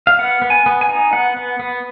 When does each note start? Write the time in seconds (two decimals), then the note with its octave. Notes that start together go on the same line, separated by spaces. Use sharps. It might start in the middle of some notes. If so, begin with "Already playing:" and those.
0.07 F5
0.19 B3 F#5
0.42 B3
0.50 G#5
0.66 B3
0.81 G#5
0.89 D#4
1.13 B3 F#5
1.36 B3
1.59 B3